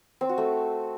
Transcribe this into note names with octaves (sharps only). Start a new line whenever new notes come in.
C4
F#4
A3